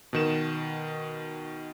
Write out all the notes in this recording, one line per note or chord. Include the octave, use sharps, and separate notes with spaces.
B2 D#3 E7